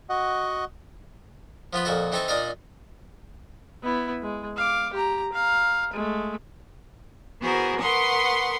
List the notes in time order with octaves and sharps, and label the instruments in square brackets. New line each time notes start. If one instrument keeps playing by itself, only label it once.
[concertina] F#4 D#5 F#5
[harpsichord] F3 B3 F4 B4
F2 A#2 A#3 F#4 A4 D#5
E3 C4 D#4 A4 D#5 C#6
A#2 D4 D#4 D5 D#5 F5
[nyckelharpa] B3 E4
G#3
F5 D6
G4 A#5
F5 A#5
G#3 A3
[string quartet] E3 B3 F#4 G#4 A#4 C5
A#4 B4 F#5 C6 C#6 D#6